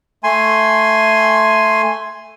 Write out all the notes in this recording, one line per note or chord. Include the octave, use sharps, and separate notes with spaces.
A3 G#5 C6